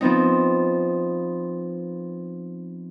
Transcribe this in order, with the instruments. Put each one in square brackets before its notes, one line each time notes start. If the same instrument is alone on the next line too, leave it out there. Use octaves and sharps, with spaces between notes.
[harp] F3 B3 C4 D#4